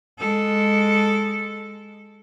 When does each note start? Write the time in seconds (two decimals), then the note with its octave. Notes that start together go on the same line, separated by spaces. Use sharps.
0.19 G#3 A4